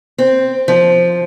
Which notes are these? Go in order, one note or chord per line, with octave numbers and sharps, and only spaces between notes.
C4
F3